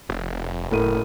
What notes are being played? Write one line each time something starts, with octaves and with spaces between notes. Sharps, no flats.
F1
F#1 A2 A#4 D#7